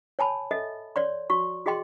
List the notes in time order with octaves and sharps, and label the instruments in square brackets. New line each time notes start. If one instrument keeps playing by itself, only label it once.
[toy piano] C#5 G#5 A5 B5
A4 D#5 E5
C#5 D5 C6
F#4 C#6
F#4 G#4 D#5 G5 C6